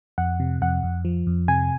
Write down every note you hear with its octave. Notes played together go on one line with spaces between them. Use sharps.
F2 F#5
C3
F2 F#5
F2
F3
F2
C3 G#5